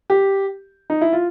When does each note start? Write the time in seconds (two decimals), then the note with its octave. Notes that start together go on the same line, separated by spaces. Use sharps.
0.10 G4
0.90 D#4
1.01 E4
1.13 F4